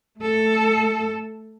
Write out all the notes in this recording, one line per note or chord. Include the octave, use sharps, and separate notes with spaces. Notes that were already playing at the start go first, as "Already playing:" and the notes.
A3 A4